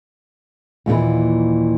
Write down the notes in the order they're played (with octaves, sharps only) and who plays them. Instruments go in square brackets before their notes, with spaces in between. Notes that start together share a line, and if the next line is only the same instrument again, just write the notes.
[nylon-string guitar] D#2 A#2 D3 E3